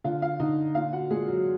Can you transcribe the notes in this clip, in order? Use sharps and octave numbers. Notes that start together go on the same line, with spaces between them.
D3 F4 F5
F4 F5
D3 D#4 D#5
A#2 F4 F5
F#4 F#5
A#2 G#3 G#4
F#3 F#4